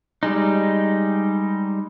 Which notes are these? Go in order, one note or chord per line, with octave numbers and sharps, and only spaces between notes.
G3 G#3 D#4